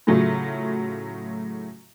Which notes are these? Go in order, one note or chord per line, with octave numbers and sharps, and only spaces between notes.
A2 C#3 F#3 A3 F4